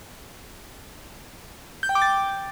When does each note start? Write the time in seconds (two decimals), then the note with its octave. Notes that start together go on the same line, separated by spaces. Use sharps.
1.83 G6
1.89 G5
1.95 D6
2.02 A6